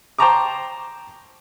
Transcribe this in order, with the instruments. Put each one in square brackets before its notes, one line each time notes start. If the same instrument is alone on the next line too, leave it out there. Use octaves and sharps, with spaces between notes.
[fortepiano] C5 G5 A5 A#5 C#6 D6